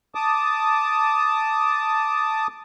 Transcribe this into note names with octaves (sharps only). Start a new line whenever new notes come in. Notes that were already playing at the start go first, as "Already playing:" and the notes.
A5 D6 D#6